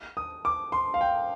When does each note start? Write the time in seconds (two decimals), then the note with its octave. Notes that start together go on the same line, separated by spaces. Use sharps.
0.17 D#6
0.45 D6
0.72 C6
0.94 F5
1.01 G5